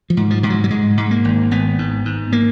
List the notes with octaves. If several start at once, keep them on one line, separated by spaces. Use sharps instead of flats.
F3
G#2
F3
G#2 F3
F#3
F#3
G#2 G#3
G#2
A#3
G#1
G#1 B3
G#2
G#2
A#3